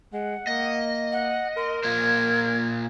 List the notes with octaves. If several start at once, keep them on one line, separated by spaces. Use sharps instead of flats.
G#3 F#5
A#3 D#5
F#5
A#4 C6
A#2 A#3 C5 G#6